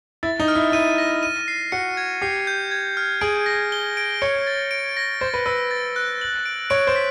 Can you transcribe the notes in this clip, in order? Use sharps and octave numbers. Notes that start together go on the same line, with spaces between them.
E4 A6
D#4
F6
E4
E4 D#7
A#6
D#7
C7
F#4 C#7
G#6
G4 C7
G6
G#6
F6
G#4 D7
A#6
G7
D7
C#5 C#7
A6
D7
A#6
C5 A6
B4
B4 E6
A6
F#6
F#7
D7
C#5 D7
C5
B6